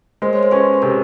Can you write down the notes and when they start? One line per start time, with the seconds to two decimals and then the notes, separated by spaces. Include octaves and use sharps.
0.22 G#3 A#4 C5
0.33 C#5
0.43 C5
0.51 C#4 A4 B4
0.74 B4
0.82 C3 G#4 A#4